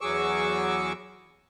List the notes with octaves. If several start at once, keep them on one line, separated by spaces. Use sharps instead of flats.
E2 F#3 G#4 C#6 D6 E6